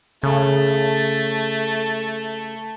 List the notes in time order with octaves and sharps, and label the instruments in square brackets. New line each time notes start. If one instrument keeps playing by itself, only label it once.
[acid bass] C#3 [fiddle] A3